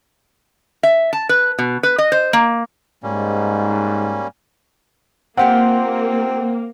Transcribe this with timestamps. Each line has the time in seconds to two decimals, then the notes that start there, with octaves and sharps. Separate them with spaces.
0.83 E5
1.13 A5
1.29 B4
1.59 B2
1.83 B4
1.98 D#5
2.12 C5
2.33 A#3
3.03 G#2 G3 A#3 C#4
5.37 A#3 C4 F4 G4 A#4 F#5